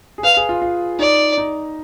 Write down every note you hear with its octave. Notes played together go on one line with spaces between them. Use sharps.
G#4
B4 F5
G#4
F4
F4
D#4 D5
D#4